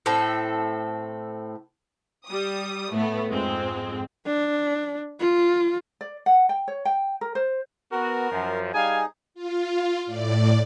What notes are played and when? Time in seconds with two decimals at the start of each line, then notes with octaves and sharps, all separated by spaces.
0.06 A2 C4 A4
2.26 G3 D#6
2.94 A2 A3 B3
3.30 F2 G#2 G#3 C4
4.26 D4
5.20 F4
6.01 D5
6.26 F#5
6.49 G5
6.68 C#5
6.85 G5
7.21 A#4
7.35 C5
7.92 B3 F#4 A#4
8.31 F#2 F3
8.74 G3 D#4 G#4 F5 G#5
9.34 F4
10.06 A2 D5